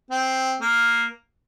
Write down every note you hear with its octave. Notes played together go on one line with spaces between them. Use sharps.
C4
A#3